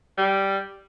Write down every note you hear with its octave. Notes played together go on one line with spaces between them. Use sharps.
G3